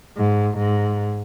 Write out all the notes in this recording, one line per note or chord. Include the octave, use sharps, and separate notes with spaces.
G#2
G#2